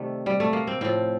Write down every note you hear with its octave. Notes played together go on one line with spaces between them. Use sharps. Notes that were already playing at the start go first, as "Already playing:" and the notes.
Already playing: C3 D#3 G3 A3
G3
A3
A#3
C4
A2 F3 C4